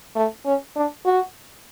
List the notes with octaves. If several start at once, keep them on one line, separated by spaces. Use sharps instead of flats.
A3
C#4
D4
F#4